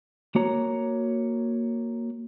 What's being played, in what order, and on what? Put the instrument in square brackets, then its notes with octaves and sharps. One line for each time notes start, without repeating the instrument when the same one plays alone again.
[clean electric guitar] A#3 F#4 C#5 A#5